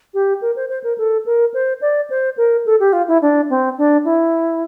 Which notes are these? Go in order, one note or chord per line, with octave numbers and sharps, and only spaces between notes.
G4
A#4
C5
C5
A#4
A4
A#4
C5
D5
C5
A#4
A4
G4
F4
E4
D4
C4
D4
E4